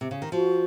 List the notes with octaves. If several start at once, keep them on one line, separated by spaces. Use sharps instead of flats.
C3
C#3
D#3
F3 F#4